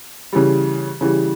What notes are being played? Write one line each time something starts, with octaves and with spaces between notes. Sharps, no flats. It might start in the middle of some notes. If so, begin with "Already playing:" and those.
C#3 E3 G3
C#3 E3 G3